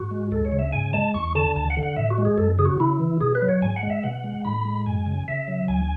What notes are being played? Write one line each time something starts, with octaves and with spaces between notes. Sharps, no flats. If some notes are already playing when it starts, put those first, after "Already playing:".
Already playing: G#2 F#4
G#3
D2 A4
C#5
C#3
E5
G#2 G#5
G#3 A5
E2 C#6
D3 A5
D2 A5
F#5
D3
F#5
A2 E5
F#4
G#3
G#4
F#2 A4
C#3 G#4
F#4
C#3 E4
E3
B2 G#4
B4
F#3
C#5
G#2 G#5
F#5
G#3
E5
B2 F#5
G#3
A2 B5
G#3
F#2 G#5
C#3
C#3 E5
F#3
D2 G#5